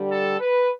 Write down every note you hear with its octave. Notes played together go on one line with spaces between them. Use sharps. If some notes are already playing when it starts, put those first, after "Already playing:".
Already playing: G2 D3 G3
A4
B4